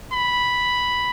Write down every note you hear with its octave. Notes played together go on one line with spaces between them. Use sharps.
B5